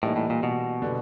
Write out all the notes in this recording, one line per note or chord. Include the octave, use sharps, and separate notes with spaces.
A2 E3 G3 A#3 D#4
A2
A#2
B2
D3 G3 B3